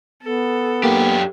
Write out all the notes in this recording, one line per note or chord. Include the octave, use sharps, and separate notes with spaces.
B3 A4
F#2 A#3 G4